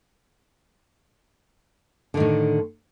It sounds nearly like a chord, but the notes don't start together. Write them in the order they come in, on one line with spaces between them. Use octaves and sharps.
D3 D#3 A2